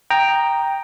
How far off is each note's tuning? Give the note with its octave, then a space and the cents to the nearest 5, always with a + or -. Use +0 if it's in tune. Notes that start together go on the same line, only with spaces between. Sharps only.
G5 +5 A#5 +0 D#6 -15